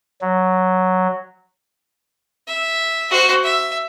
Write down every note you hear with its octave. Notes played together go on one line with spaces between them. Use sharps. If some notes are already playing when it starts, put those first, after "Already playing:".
F#3
E5
F#4 C5
E5